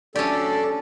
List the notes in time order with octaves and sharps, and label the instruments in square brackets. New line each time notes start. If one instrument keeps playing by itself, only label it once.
[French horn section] F#3 A3 D4 [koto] C#4 G4 [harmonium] A4 [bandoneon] D5